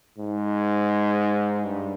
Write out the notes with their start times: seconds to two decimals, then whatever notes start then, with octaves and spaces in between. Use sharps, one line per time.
0.18 G#2
1.65 G2